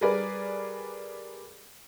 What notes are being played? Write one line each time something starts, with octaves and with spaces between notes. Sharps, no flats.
G3 G#4 A#4 B4 D5